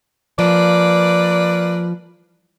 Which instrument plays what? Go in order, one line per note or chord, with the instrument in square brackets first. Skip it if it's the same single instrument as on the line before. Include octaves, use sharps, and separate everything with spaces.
[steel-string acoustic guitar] F3 [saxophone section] A#3 B4 D5